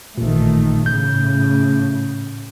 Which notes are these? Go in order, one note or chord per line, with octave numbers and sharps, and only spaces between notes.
A1 A#2 D#3 A3
A2 C#3 G6